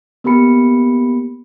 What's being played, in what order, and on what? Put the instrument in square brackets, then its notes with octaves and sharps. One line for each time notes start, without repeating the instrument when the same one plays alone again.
[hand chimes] A#3 B3 G4 B5 C#7